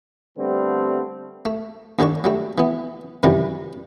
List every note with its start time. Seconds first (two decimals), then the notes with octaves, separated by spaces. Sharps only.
0.38 D3 G3 A3 B3 C4
1.45 A3
1.99 D#2 D3 D#3 D4 C#6
2.24 F#3 G3 A3
2.58 E3 B3
3.23 F#2 C3 D#3 E3 F#3 G3